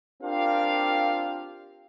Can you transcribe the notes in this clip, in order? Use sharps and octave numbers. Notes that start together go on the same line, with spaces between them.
C4 D4 F4 G4 A#4 F5